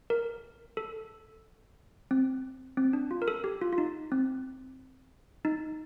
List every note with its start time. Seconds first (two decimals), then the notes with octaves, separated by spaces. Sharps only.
0.10 A#4
0.77 A4
2.11 C4
2.77 C4
2.93 D4
3.11 F4
3.22 A#4
3.28 A4
3.44 G4
3.61 F4
3.73 F4
3.78 D#4
4.12 C4
5.45 D#4